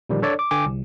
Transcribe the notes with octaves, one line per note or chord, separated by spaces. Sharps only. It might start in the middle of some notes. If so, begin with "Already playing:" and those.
A#2 D3 D#3 F3 G3 A#3
D4 A4 C#5 D5
D6
D3 G5 G#5 D6
C2